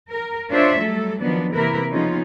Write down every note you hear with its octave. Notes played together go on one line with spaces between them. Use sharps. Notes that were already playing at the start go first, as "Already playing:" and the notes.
A#4
D4 F4 C5 C#5 E5
F#3 G3 A3 A4
D#3 F3 F#3 B3 D4
C3 E3 A#3 E4 A#4 B4
C#3 F3 B3 C#4 D#4 F4